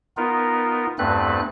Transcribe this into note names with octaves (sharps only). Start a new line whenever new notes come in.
B3 D#4 F4 A#4
E2 G2 A3 C4 B4 F#6